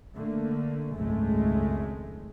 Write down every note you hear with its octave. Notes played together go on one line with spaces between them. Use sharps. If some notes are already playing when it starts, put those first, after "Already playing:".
D3 A3 A#3
G#1 C#2 F#2 G#3 A3